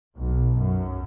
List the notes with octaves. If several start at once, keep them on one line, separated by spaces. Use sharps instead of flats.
B1
F#2